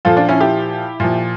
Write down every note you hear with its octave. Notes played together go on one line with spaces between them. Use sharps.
A#2 F3 F4 A4
D4 F4
C#4 E4
E4 G4
A#2 F3